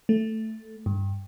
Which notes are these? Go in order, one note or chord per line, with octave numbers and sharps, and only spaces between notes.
A3
G2